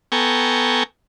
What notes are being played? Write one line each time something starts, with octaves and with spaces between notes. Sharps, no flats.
B3 A4 G5 G#5 A#5 C#6